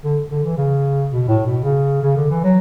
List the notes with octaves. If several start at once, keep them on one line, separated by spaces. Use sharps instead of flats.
D3
D3
E3
C#3
B2
A2
B2
C#3
C#3
D3
E3
F#3